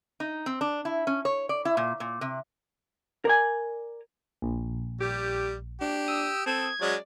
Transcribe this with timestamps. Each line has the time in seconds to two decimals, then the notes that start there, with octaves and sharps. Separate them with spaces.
0.20 D#4
0.46 C4
0.61 D4
0.85 E4
1.07 C#4
1.25 C#5
1.49 D5
1.65 E4
1.77 A#2
2.00 A#2
2.21 C3
3.25 A#4 D5 G#5
4.42 A#1
5.01 G3 G4
5.81 D4 G4
6.08 D#6 E6
6.46 C4 A4 G#6
6.82 F#3 G#3 C#4 D5